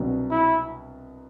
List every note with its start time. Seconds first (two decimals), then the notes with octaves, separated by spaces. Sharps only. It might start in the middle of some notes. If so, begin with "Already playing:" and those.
Already playing: C2 B2 F#3 B3 D4
0.31 E4